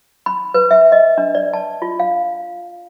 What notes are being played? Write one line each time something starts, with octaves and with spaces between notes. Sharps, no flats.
B5
B4
E5
D#5
D4
D5
A5
F4
F5